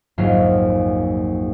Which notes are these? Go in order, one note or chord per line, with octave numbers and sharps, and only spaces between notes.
A#1 F2 G#2 F#3 F5